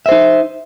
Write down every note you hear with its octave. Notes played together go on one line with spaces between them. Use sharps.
D#4 C5 E5